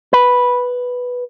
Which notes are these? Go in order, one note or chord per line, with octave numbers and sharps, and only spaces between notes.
B4